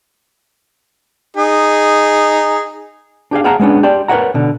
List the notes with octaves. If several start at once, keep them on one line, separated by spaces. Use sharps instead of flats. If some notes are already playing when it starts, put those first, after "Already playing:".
D#4 G#4
D4 G4 G#4 F5
G#4 C#5 F5 F#5 A5 A#5
G#3 A#3 B3 C#4 D4
G4 D5 A5 C6
A#4 B4 C#5 D#5 F#5 A#5
B2 D3